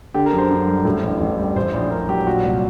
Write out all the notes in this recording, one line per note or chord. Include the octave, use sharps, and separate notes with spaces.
D3 G4
A#4
F#2
C5
F#2 C5
G3
A2
A1
A1
G3
A2 C5
A#1
A#1 A#4
F#3 G4
A#2 F#4
C2